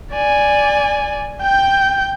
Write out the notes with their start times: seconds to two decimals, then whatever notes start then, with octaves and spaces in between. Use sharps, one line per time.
0.13 D5 G#5
1.41 G5 G6